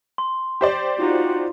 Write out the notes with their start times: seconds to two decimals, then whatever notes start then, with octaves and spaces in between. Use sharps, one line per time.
0.18 C6
0.61 G4 C5 D5
0.98 D#4 F4 F#4